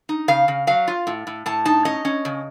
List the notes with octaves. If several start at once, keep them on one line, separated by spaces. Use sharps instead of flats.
D#4
C#3 F5
C#3
F#3 F5
F4
A2
A2
A2 A5
D#4 A5
C#4 D#5
C#4
C#3